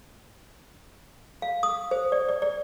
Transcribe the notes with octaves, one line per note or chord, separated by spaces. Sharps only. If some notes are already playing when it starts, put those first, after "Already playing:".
F5
D#6
C5
D5
D5
D5